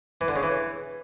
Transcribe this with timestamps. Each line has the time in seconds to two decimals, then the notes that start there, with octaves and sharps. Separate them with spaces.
0.21 E3
0.28 D3
0.36 C#3
0.43 E3